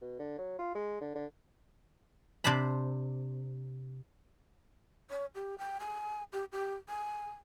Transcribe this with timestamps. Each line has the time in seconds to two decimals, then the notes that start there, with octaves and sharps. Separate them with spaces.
0.01 B2
0.19 D3
0.38 F#3
0.59 F4
0.75 G#3
1.01 D3
1.15 D3
2.44 C3 D4 C5 A5 B5
5.10 C#5
5.35 G4
5.58 G5
5.80 G#5
6.32 G4
6.52 G4
6.89 G#5